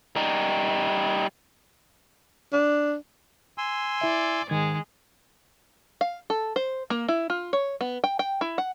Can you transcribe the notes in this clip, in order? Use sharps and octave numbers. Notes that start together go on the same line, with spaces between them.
G3 D#4
D4
G#5 C6 E6
E4 D5 E5
G#2 D#3 G#3 G#6
F5
A4
C5
A#3
E4
F4
C#5
B3
G5
G5
E4
F#5